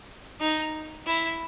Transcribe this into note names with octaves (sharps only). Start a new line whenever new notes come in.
D#4
E4